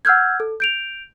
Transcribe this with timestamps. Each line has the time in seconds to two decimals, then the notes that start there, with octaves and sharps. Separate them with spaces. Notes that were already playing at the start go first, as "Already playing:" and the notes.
0.05 F#5 E6 F6 G6 G#6
0.40 A4
0.60 G6 D7 F7